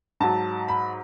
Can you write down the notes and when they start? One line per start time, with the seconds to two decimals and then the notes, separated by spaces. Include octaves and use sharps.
0.20 G#2 F#3 A5
0.68 B5